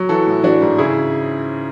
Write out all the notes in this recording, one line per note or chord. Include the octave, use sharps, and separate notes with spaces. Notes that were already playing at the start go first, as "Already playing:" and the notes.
Already playing: F#3
E3 F#4 A4
A2
E3 D4 F#4
G#2
C#3 E4 G#4